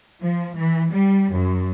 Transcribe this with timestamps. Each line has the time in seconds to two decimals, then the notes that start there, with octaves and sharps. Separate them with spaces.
0.21 F3
0.56 E3
0.93 G3
1.32 F#2